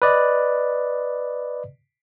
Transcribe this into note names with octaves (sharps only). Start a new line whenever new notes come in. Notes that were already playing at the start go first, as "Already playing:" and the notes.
B4 D5 D#5